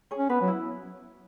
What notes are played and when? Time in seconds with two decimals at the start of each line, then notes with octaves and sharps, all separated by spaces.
0.11 G#4 C#5
0.18 C#4
0.29 B3 B4
0.41 F#3
0.47 E4